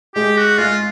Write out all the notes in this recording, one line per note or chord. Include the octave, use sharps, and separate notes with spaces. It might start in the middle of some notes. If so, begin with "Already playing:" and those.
G#3 G4 G#4
F#4
G#3 F4 G#4